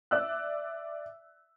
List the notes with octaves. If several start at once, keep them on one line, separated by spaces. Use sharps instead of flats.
D5 E5 E6 F#6